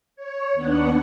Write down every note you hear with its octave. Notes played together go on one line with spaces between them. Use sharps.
C#5
D#2 B3 D4 F#5